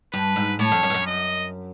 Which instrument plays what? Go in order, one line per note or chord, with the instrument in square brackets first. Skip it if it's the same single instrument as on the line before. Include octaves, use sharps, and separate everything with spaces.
[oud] G2 [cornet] B4
[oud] G#2
[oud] A2 [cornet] C#5
[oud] F2
F#2
G2
F#2
[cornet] D#5